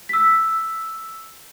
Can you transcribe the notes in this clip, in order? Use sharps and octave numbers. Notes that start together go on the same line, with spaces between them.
E6 B6